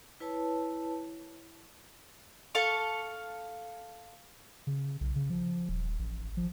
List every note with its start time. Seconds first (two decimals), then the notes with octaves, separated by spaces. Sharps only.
0.20 E4 B4 C#5 A5
2.55 A4 F5 C#6
4.67 C#3
5.01 B1
5.16 C#3
5.30 F3
5.69 D#1
5.99 A1
6.37 F3